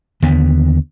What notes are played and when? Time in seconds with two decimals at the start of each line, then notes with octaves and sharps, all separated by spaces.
0.22 D#2 D3 B3